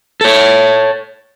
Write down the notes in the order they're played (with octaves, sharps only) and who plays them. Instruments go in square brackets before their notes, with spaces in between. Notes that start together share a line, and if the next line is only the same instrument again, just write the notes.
[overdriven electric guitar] A4 C#5